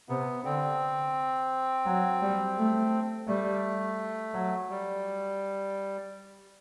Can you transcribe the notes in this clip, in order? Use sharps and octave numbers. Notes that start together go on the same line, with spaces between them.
C3 B3
D3 C4
F#3
G3
A3
G3 A3
F#3
G3